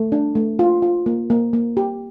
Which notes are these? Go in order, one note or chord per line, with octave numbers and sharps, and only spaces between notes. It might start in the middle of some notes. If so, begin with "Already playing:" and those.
Already playing: A3
D4
A3
F4
F4
A#3
A#3
A#3
G4